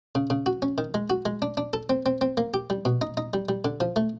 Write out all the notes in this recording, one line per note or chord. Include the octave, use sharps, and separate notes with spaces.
C#3
C#3
F#4
C#4
D#3
G#3
F#4
G#3
D4
D4
A4
C4
C4
C4
A#3
G4
G3
B2
D#4
D#4
G3
G3
D3
F3
A3